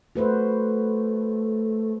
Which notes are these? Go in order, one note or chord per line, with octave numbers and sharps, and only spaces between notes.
A3 F#4 B4 C5